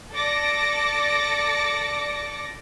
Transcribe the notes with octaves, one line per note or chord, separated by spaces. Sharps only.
A4 D5 D6 A#6 C#7